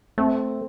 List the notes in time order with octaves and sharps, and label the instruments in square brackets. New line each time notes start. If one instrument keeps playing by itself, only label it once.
[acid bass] A3 [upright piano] C4